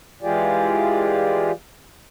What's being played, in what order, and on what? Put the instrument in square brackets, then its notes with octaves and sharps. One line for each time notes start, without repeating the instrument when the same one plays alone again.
[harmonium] E3 G#3 F4 G4 G#4 D5